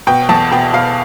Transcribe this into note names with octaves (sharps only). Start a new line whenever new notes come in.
B2 G5
E2 A5
B2 G5
B2 F5